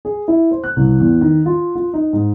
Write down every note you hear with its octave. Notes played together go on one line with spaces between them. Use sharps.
G#4
E4
C5
F#6
C2
E2
D#3
F4
F4
D#4
G#2